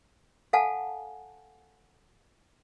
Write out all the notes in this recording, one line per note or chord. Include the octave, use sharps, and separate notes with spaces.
A4 F5 F#5 G#5 A5